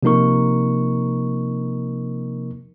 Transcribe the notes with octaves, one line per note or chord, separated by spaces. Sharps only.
C3 F3 A#3 D#4 A#4 C#6